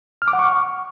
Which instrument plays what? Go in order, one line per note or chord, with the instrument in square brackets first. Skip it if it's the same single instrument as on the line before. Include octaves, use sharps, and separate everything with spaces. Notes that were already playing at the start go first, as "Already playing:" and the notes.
[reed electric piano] F6
D6
F#5
C#6